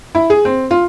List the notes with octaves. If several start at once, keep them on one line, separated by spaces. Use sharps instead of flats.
E4
G#4
C4
F4